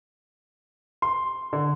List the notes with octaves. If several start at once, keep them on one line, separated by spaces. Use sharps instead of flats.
C6
D3